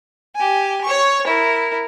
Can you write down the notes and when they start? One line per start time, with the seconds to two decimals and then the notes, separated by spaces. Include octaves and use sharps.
0.35 G4 G#5
0.84 C#5 C#6
1.27 E4 A#4